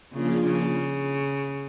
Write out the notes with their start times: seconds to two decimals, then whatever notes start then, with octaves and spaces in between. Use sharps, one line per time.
0.13 C#3 F3 A#3 D4 F4 G#4
0.47 C#3